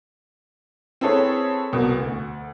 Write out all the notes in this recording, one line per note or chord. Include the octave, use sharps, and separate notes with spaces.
C4 E4 G#4 A4 B4 C#5
C2 B2
D2